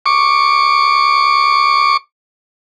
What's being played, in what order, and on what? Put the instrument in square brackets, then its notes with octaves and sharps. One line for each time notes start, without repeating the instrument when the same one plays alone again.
[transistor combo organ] C#6 D6